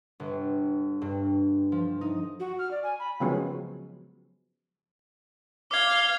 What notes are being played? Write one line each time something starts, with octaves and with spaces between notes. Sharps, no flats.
G1
G2
F3
D#4
F#4
F6
D5
G#5
B5
C#3 F3 F#3 G#3 B3 C#4
F5 D6 G#6 G7